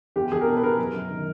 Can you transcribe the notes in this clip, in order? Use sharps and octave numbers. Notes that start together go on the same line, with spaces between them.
E2 G4
E2 G#4
A#4
B2 A4
B4
B2 A#4
F#2
F#2
D#3